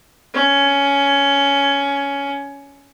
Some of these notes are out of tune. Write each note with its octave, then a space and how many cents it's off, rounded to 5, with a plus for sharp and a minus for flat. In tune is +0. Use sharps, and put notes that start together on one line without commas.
C#4 +15